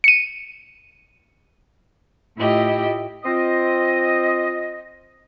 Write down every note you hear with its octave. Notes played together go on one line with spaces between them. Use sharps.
C#7 D#7
A2 E4 F4 G4 D#5
C4 F4 D#5